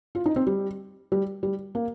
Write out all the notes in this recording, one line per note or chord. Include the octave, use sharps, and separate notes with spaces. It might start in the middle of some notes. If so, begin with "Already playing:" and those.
F4
D#4
C4
G3
G3
G3
A#3